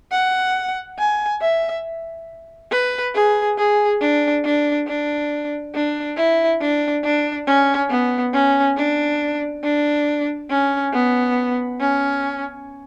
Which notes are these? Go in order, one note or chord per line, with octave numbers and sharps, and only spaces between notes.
F#5
G#5
E5
B4
G#4
G#4
D4
D4
D4
D4
E4
D4
D4
C#4
B3
C#4
D4
D4
C#4
B3
C#4